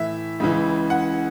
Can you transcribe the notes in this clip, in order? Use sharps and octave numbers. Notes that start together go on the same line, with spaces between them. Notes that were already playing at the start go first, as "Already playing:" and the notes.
Already playing: A2 E3 E5
C#2 C#3 E3
F#5